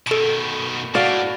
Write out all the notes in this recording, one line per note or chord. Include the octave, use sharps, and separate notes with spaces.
B2 D#3 A4 D7
A2 F#4 D5 F5